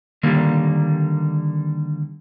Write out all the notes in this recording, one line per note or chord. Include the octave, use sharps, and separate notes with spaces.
D3 D#3 G3 A#3